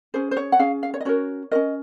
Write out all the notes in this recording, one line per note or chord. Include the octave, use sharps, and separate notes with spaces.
C#4 G#4 C5
C5
C#5
F#5
C#4 G#4 F5
F5
C#5
D#5
C#4 F#4 A#4 C#5
C#4 F#4 A#4 D#5